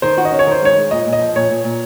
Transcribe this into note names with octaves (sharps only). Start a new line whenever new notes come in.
D#3 C5
F#4
D#5
C#4
C#5
D#3 C5
G#3 C#5
G#3
A#2 D#5
A#2
D#5
F3
A#2 C#5
A#2
A#2